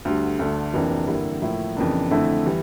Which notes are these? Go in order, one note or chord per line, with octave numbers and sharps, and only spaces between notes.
D2 D3 G3
D2 D3 A3 D4
F1 F2 E3 A#3 D4
G2 D3 G3 A#3 E4
A2 F3 A#3 E4
F2 C#3 E3 A#3 D4
F2 D3 A3 E4
E3 G3